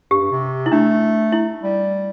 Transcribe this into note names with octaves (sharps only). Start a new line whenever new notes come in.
G2 G4
G2
C3
E4
A3 D4
E4
G3